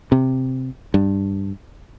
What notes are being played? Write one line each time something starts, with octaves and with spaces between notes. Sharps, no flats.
C3
G2